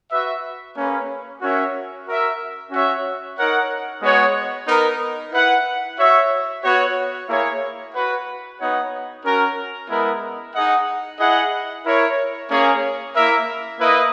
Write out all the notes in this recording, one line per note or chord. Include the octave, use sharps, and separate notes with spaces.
F#4 B4 E5
A#3 C#4 G#4 B4
C#4 F#4 A#4 C#5 E5
F#4 A#4 E5
C#4 F#4 C#5 E5
D#4 A#4 C#5 F#5
G#3 B3 F#4 C#5
B3 D#4 A#4
E4 B4 F#5
F#4 C#5 E5
B3 F#4 C#5
A#3 E4 G#4 C#5
F#4 B4 F#5
B3 D#4 F#4 C#5 F#5
C#4 F#4 A#4
G#3 B3 E4 A#4
D#4 G#4 D#5 F#5
E4 G#4 D#5 F#5
E4 A#4 C#5
A#3 C#4 G#4 C#5
A#3 E4 A#4 E5
A#3 E4 B4 D#5